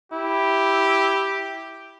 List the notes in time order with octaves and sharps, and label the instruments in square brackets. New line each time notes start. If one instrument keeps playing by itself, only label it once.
[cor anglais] E4 [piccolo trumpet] G4